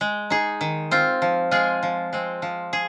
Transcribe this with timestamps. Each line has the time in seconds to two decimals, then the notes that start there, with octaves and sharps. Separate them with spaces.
0.01 G#3
0.30 D#4 G#4
0.61 D#3
0.91 C4 F4
1.22 F3
1.51 G#3 F4 G#4
1.83 F3
2.13 G#3 C4
2.42 F3
2.73 G#4